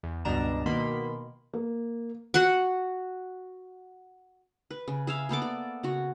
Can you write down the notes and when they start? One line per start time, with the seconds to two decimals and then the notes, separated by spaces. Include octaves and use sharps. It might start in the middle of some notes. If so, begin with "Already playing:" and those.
0.03 E2
0.25 C#2 G2 B2 D4 A#5 E7
0.66 B2 D#3 A#3 B5 C6
1.54 A#3
2.34 F#4 F#5
4.71 B4
4.88 C#3
5.07 G#4 E5 F5
5.29 A#3 B3 A4 D6
5.42 D5 D6
5.83 C#3 F#4